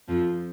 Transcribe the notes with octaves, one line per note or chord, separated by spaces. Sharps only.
F2 F3